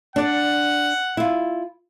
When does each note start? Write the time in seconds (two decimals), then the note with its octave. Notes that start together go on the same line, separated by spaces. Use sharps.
0.16 D4 D5 F#5
1.17 E4 F4